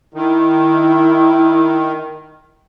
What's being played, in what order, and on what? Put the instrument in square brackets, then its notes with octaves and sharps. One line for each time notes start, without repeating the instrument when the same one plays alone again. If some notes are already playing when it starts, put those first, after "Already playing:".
[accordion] D#3 [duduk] E4